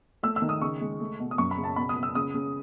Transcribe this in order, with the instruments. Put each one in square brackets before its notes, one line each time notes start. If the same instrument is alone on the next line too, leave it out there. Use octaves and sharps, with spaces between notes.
[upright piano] A3 E6
E6
D#3
D#6
C#3 C#6
G#3
A3
B2
D#6
F#2 C#6
B5
C#3
A5
B2 B5
D#6
B3
E6
C#3 D#6
C#3